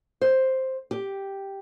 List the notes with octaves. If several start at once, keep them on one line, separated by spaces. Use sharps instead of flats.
C5
G4